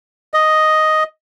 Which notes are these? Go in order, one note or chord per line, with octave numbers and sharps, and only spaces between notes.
D#5